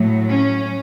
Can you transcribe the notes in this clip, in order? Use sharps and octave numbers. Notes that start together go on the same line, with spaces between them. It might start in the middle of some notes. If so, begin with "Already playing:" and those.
Already playing: A2 F#3 A3
C#4